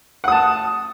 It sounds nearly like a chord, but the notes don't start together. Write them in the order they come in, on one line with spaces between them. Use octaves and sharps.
F#5 D#6 A5